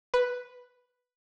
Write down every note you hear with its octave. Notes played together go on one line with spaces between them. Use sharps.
B4